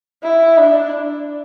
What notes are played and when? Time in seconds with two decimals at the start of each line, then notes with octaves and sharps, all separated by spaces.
0.23 E4
0.58 D4